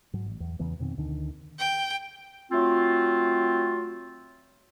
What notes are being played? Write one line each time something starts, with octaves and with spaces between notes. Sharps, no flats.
G#2 F#3
A1
E2
E2 C#3 E3 B3
F2 B2 D#3 C4
D2 D3 D#3
G5
F#3 A3 C4 F4